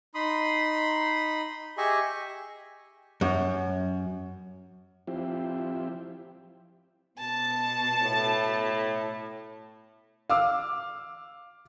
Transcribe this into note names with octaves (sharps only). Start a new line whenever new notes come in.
D#4 B5 C6 D#6
G4 G#4 D#5 E5 G#5 C#6
F#2
F3 C4 E4 G4
B2 A5
A2
F5 D6 E6